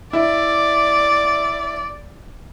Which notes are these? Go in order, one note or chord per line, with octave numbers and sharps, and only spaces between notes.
E4 D5